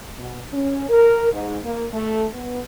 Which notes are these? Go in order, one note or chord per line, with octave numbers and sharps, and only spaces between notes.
B2
C#4
A#4
G#2
A#3
A3
B3